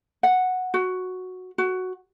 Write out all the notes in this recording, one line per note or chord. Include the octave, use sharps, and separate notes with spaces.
F#5
F#4
F#4